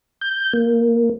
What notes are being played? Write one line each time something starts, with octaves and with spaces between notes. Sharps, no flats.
G6
A#3